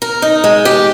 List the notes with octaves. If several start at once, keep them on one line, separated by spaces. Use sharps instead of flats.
A#4
D#4
G#3
G4